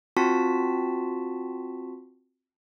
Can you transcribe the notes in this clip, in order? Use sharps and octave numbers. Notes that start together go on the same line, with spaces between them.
C4 F4 F#4 A5 B6